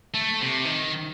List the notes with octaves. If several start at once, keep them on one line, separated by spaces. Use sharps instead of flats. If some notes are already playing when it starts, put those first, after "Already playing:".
A3
C3
D#3